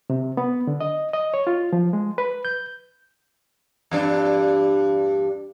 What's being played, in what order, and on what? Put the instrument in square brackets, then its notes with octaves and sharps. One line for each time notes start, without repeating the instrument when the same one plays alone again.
[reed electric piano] C3
B3
D3
D#5
D#5
C#5
F4
F3
G#3
B4
G6
[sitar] E2 G2 D4